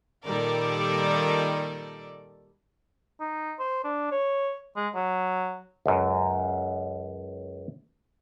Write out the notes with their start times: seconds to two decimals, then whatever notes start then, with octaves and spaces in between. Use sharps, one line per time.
0.24 A#2 D#3 G3 A4 A#4 D5
3.20 D#4
3.59 C5
3.84 D4
4.11 C#5
4.76 G#3
4.95 F#3
5.86 C#2 F#2